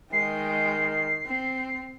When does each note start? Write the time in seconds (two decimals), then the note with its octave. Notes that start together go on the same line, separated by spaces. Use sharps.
0.12 D#3 G#3 G5 C7
1.25 C4